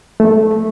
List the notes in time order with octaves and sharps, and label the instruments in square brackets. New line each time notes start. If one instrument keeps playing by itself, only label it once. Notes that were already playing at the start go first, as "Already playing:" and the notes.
[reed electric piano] A3